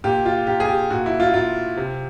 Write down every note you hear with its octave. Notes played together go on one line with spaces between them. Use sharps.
A#2 G4
F4
A#2 G4
G#4
G4
A#2 F#4
E4
F4
A#2 F4
C3